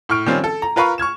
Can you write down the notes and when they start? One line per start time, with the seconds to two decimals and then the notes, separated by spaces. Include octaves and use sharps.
0.09 A2 C#6 F6 D7
0.26 D#3 F3 G3 C4 C#4 F4
0.44 A4
0.62 A#5
0.76 F4 A#4 B4 F5 B5 C#6
0.98 C#6 F6 G#6 E7